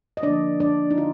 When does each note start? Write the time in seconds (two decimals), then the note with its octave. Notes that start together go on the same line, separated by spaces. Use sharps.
0.17 D#5
0.23 D3 F3 A#3 D4 D5
0.60 D4 D5
0.91 D#4
0.98 D3 F4